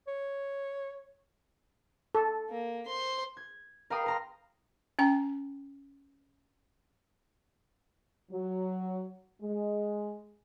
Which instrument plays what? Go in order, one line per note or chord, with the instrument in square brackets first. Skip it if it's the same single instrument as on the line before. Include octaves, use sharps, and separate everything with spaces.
[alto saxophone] C#5
[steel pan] A4
[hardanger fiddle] A#3
C5 C6
[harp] G#6
A#4 F5 G5 A#5 B5 D#6
A#4 A#5 C6
[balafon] C#4 G5 A#5
[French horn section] F#3
G#3